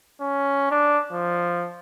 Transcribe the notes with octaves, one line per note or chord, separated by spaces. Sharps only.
C#4
D4
F3